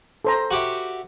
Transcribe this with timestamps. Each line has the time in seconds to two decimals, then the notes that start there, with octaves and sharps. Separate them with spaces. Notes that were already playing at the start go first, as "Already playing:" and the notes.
0.25 A4 C5 A#5
0.51 F#4 G4 E5